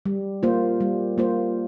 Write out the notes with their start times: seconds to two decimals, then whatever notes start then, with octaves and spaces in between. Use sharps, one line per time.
0.06 G3
0.43 A#3 F4 C5
0.81 G3
1.18 A#3 F4 C5